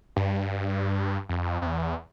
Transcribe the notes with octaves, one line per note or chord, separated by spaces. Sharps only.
G2
F2
F2
E2